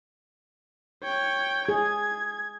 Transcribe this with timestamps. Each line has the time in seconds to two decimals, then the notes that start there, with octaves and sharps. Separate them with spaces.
1.03 C#5 G5
1.69 G#4 G#6